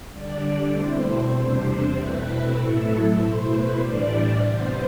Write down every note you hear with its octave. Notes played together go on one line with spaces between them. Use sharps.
D3 G3 D4 D5
B2 A3 C4 E4 C5
E2 C3 G3 D4
B2 A3 C4 E4 B4
A2 F#3 A3 E4 A4
B2 A3 E4 C5
B4
A2 E3 G3 D4 D5
D5
C3 G3 B3 C5